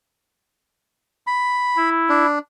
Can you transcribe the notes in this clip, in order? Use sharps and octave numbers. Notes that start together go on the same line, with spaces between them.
B5
E4
D4